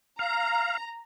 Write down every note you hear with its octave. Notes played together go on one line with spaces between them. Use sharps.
F5 A#5